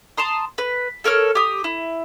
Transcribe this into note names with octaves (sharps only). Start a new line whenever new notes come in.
A5 A#5 C6 D#6
B4
A4 A#4 C#5 F6
G4 D#6
E4